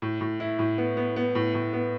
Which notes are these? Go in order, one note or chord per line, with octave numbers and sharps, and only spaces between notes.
A2
A2
E4
A2
B3
B3
B3
A2
A2
B3